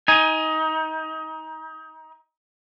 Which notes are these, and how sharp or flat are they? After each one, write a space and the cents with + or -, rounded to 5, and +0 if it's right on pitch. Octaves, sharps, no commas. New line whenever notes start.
D#4 +25 G#5 +0